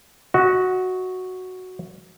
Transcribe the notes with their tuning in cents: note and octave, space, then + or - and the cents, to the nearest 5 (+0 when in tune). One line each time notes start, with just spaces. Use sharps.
F#4 +0 D#5 +35